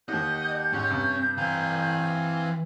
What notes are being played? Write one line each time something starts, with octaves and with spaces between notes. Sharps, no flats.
D#2 D#3 G4 D#5 F#5 G6
G#2 C#4
G2 C3
E3 C4 F5 G#5 A#5